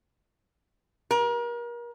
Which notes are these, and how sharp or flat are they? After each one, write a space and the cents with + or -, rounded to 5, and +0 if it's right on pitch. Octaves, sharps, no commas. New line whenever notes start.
A#4 +35